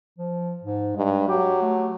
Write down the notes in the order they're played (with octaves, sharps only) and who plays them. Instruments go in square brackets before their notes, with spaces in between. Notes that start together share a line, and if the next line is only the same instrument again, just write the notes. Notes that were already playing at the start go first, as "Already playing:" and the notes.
[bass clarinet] F3
G#2
[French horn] G2 [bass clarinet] G#3
[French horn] F#3 [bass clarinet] G4
[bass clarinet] A3